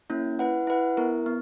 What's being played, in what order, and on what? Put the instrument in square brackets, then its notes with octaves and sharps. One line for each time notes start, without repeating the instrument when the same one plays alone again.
[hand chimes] A#3 C#4 E4
E4 B4 F#5
E4 B4 F#5
B3 E4 A#4
B3